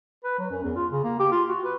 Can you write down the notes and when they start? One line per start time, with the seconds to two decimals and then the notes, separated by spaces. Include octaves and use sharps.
0.24 B4
0.38 F#3
0.50 F#2
0.63 E2
0.76 F4
0.91 C#3
1.04 A#3
1.19 G4
1.32 F4
1.49 F#4
1.65 B4